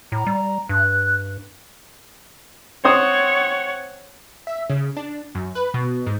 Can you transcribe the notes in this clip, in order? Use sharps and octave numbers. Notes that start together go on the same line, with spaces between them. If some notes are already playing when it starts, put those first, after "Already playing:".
A2 A#5
G3
G2 F#6
C4 C5 C#5 F#5 D#6
E5
C#3
D4
F#2
B4
B2
G#2